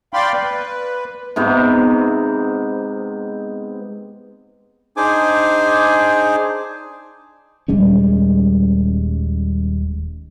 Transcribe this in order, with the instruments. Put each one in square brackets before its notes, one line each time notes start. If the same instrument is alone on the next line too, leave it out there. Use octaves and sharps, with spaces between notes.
[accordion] D5 F5 G5 B5 C6
B4
[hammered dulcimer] G#2 C3 B3
[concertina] D4 D#4 G#4 C5 G#5 D6
[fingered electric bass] D#1 G3 G#3 C#4